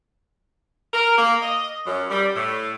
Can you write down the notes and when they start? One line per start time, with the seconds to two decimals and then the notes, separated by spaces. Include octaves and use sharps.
0.93 A#4
1.18 A#3
1.42 D#5
1.86 F#2
2.10 G3
2.36 A2